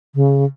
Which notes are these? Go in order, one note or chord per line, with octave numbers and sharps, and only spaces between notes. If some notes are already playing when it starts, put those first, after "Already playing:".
C#3